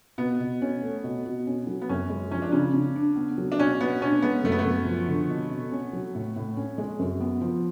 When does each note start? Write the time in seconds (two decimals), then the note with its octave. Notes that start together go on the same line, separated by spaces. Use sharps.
0.18 B2 B3
0.40 B2
0.62 C#4
0.82 A3
1.04 B2
1.26 B2
1.47 C#4
1.67 F#3
1.82 B3
1.89 F#2 C#4
2.09 G#3
2.31 F3 C#4
2.42 D4
2.52 C#3 C#4
2.74 C#3
2.96 D4
3.16 B3
3.38 F#3
3.52 D4
3.59 B2 C#4
3.81 B2 B3
4.01 C#4 D4
4.22 G#3 B3
4.44 F#2 A3
4.52 B3
4.58 A3
4.65 F#2
4.86 F3
5.08 D3
5.30 B2
5.50 B2
5.72 C#4
5.93 F#3
6.15 A2
6.36 A2
6.57 C#4
6.78 G#3
6.99 F#2
7.20 B3
7.41 F3